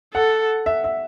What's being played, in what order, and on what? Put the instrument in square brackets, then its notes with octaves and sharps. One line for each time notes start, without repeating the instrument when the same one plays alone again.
[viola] A4 [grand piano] F#5
[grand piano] E5
E5